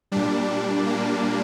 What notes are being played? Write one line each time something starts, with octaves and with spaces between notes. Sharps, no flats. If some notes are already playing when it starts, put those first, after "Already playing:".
A#2 G3 D4
A#3